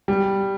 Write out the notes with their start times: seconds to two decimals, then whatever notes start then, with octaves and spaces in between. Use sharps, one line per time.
0.08 G3